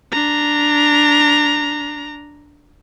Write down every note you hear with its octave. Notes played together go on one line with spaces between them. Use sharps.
D4 A#5